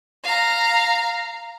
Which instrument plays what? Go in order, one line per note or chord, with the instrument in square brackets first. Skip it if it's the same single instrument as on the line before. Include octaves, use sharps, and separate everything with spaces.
[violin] F5 A#5